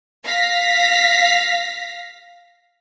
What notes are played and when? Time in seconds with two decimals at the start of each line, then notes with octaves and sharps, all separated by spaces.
0.24 F5 A#6 B6